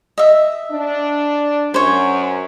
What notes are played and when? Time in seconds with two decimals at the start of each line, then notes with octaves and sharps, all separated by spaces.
0.18 D#5 E5
0.72 D4
1.74 F#2 C5 C#5